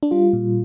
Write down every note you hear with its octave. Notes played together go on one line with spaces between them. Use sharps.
D4
G3 F4
A#2